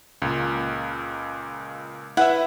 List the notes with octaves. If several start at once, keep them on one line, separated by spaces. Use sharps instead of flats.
C#2 A#2
E4 B4 E5 F#5